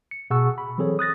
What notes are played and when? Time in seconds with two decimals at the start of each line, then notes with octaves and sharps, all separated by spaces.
0.11 C#7
0.30 B2 G#4 F#5 A5 C#6 E6
0.58 B5
0.78 E3 F#3 C4 G#4 A4 C#5
0.99 D#6 F#6 A6 A#6